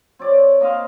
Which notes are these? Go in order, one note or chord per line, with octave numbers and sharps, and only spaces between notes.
C4 C#5 D5
A#3 D#5 F5 C6